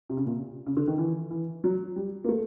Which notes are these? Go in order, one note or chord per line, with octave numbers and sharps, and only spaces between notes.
C3
C#3
A#2
C#3
D3
D#3
E3
E3
F#3
G3
A#3
A3